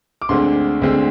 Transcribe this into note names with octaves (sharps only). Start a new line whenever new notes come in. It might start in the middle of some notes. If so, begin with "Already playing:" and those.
D6
D2 D3 G#3 C4 C6
D2 D3 G#3 C4